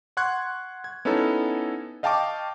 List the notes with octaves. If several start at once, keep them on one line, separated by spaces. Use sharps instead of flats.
F#5 C6 C#6 F#6 G#6
G#6
B3 C#4 D#4 E4 A4
D#5 F5 G5 A5 C#6 D6